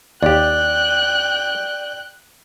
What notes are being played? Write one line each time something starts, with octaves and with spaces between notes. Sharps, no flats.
D#2 G4 D5 G5 F#6